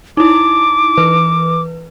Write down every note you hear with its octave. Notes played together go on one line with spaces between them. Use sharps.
D#4 E4 D6
E3 B4